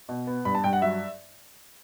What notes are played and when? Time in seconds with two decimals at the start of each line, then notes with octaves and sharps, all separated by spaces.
0.09 B2
0.27 B3
0.45 G2 B5
0.55 A5
0.64 G2 G5
0.73 F#5
0.82 F#3 E5